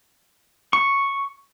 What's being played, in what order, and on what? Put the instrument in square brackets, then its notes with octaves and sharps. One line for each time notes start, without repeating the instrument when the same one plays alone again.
[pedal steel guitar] C#6